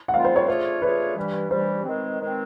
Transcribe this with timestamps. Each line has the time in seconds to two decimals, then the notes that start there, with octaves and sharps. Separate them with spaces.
0.08 F#5
0.14 G#2 D#3 G3 C4 F4 F5
0.25 C5
0.36 C#5
0.48 A3 D4 F4 G#4 C5 C#5
0.82 A3 D4 F4 G#4 B4 C#5
1.16 G2 E3 G3
1.50 G2 E3 G3 C5
1.85 D#3 G#3 C4
2.20 D#3 G#3 C4